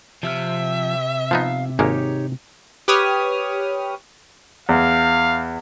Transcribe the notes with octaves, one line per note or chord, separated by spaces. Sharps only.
C3 F3 E5 F6
F3 B3 D#4 F5
G#1 G#3 A#3 D#4 G4 C#5
G4 B4 C#5 D#6 F6
E2 F5